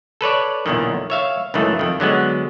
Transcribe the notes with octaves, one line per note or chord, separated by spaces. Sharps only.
A4 B4 C#5 D5
B1 E2 A#2 D3 D#3
C#5 E5 F5
C#2 F#2 D#3 E3 A3
F2 D#3
D3 F#3 G#3 B3